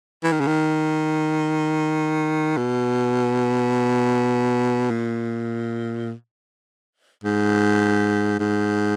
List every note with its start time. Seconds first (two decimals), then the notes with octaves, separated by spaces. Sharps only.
0.24 E3
0.32 D#3
0.40 C#3
0.47 D#3
2.57 B2
4.91 A#2
7.24 G#2
8.40 G#2